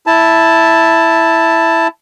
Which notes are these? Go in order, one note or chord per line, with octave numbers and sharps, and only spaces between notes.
E4 A5